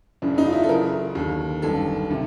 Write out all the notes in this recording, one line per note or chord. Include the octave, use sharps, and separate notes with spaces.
F#1 F#2 C#3 E3 D4
D#4
F4
E4
A4
F#1 F#2 C#3 E3 A#4
D#2 D3
G1 F#2 D#3 A4
C3 D#3